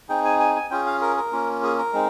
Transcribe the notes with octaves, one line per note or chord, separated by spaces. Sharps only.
C4 D#4 G#4 G5
G#5
G#5
G#5
C#4 F4 G#4 G5
F5
A#4
A#4
A#3 C#4 F4
G#4
A#4
G#3 C4 D#4